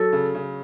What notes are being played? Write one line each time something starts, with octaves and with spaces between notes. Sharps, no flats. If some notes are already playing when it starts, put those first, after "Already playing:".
Already playing: F#3 A4
C#3
C#3